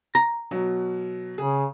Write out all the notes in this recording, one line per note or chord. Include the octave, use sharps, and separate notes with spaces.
A#5
B2 F#3
C#3 G#4